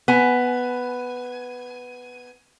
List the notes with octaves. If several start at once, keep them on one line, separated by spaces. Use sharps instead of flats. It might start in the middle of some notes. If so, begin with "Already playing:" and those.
B3 G#5